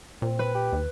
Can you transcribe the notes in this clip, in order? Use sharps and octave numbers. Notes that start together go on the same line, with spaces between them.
A#2 C4
B4
G4
D#2